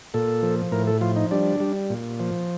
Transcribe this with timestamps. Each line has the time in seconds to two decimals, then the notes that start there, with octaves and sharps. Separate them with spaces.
0.14 A#2 A4
0.43 F3
0.72 A2 A#4
0.87 A4
1.01 F3 F4
1.16 D#4
1.31 G3 D4
1.60 G3
1.90 A#2
2.20 F3